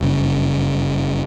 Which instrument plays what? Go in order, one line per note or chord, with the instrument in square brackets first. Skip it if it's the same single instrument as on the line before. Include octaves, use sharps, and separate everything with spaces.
[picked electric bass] F#1 G2 C#3